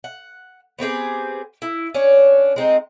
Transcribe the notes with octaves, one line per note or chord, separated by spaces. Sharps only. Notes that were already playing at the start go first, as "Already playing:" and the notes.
F#5
B3 C4 G4 G#4
E4
C#4 D4 C#5
G#3 C4 D#4